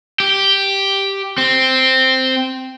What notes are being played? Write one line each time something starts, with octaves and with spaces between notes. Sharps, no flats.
G4
C4